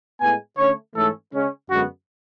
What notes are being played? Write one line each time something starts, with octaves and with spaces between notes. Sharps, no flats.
A2 G#3 B3 G#5
D3 A3 C#4 C#5
G#2 E3 A3 C#4 A4
C#3 G#3 C#4
F#2 D3 G#3 B3 F#4